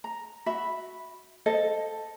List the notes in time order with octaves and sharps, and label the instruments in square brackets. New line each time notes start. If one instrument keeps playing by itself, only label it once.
[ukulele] A#5
F#4 E5 B5
A4 C5 D#5 F5